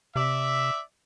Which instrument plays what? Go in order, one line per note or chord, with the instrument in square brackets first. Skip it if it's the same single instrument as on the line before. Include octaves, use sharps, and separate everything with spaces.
[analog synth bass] C3 [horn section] D5 E5